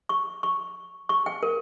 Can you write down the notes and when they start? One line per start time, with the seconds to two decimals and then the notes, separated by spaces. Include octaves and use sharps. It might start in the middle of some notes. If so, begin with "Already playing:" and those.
0.09 C#6
0.43 C#6
1.09 C#6
1.26 G5
1.43 A#4